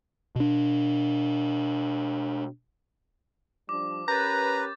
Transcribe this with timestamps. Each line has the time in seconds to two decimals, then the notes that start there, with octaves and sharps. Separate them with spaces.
0.36 B2 D4
3.69 F3 G3 D4 D6
4.08 C#4 G4 A#4 B4 A#5 G6 A6